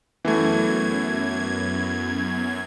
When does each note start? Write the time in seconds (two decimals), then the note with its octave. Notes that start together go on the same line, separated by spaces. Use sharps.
0.25 F#2 E3 A3 B3 G#6